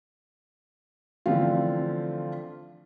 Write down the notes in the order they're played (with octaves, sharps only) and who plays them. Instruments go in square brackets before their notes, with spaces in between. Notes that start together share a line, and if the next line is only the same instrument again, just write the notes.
[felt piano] D3 E3 F3 A3 C4 F4